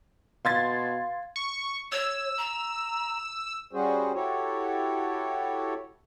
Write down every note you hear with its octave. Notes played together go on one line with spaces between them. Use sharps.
B2 F5 C6 G#6 A6
C#6
C#5 E6
A#5
G3 C#4 F#4 G#4 C5
E4 F#4 G4 A4 C#5